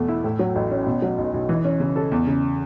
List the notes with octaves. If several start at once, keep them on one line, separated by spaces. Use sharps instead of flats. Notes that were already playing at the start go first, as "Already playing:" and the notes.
Already playing: E2 B2 A3
E4
A2
F#3
A1
C#4
B2
F#3
B1
B1
E3
C#4
C#3
A4
E2
C#3